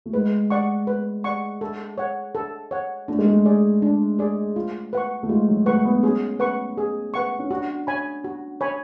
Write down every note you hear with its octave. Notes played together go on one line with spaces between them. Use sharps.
A3
G#3 B4
D5 F#5 C#6
B4
D5 F#5 C#6
A4
C#5 F#5
A4
C#5 F#5
A3 D4
G#3
A3
G#4 D5
D4
G#4 D5
F4
B4 F#5 C#6
A3
G#3 F4
F#3
A3 B4 F#5 C#6
B3
C#4 G#4
B4 F#5 C#6
G#4
B4 F#5 C#6
C#4
D4 F#4
C#5 G#5 B5
F#4
C#5 G#5 B5